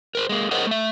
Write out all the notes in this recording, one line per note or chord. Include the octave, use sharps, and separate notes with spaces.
A#4 C5
G#3 A#3
G#4 A#4 C5 C#5 D#5 F#5
A3 E5